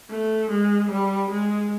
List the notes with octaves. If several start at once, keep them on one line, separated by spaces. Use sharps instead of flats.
A3
G#3
G3
G#3